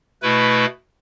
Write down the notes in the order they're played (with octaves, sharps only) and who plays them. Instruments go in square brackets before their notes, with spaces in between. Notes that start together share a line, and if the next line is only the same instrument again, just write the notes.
[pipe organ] B2 A3 E4 B4